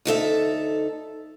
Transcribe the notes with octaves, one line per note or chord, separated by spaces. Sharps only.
D2 D#4 A4 E5